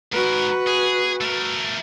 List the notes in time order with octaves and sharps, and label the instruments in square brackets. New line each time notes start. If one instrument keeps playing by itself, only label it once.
[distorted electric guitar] G#2 A#4 [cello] F#4 B4
[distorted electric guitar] G#4
A3 A#4